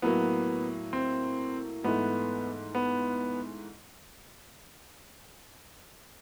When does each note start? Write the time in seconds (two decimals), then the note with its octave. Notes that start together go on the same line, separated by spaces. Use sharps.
0.02 A2 F#3 A#3 B3
0.93 C4
1.84 G#2 E3 A3 B3
2.75 B3